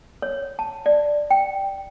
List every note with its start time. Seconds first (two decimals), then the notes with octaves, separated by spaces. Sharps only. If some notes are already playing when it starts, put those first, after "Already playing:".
0.22 C#5
0.59 A5
0.86 D5
1.31 G5